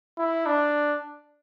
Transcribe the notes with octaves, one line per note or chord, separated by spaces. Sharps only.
E4
D4